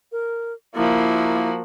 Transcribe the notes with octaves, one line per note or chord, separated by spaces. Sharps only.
A#4
F3 A#3 E4 F#4